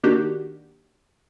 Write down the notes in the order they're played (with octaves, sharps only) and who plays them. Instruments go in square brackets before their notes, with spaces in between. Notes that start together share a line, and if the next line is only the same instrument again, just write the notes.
[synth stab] D#3 A#3 D4 F#4 G4